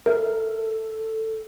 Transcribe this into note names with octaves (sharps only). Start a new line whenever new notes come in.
A4 A#4 E5